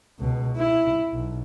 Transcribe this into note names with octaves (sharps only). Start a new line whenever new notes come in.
C#2 B2
E4
B1